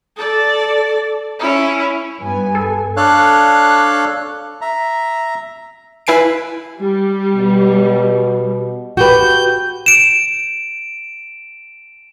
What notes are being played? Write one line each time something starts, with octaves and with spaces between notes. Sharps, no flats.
A4 D5
C#4 E4
G2 B3 G#5
A4
D4 A4 C#5 F5 F#6
E5 A#5
E4 B4 G#5 C7 D7
G3
B2
F#4 G4 B4 G6
D7 E7